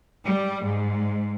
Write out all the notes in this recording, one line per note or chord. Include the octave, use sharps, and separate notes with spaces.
G3
G#2